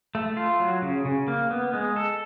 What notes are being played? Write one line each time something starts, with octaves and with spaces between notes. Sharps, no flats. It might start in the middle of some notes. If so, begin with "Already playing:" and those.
A3
F4
F#3
C#3
C#3
A#3
B3
G#3
A4